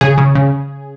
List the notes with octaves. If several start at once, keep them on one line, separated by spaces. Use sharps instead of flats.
C#3 G#4
C#3
C#3